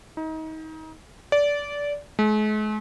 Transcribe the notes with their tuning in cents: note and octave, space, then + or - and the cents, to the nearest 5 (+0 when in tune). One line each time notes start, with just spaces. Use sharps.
D#4 +30
D5 -20
G#3 +45